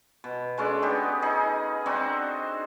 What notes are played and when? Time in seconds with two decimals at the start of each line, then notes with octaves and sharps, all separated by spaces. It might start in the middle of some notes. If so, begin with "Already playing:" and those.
0.24 B2
0.58 G#3 A3 C#4 D4
0.82 B3 D#4 G4
1.22 D#4 G#4 A4 D#5
1.86 C4 D4 D#4 F#4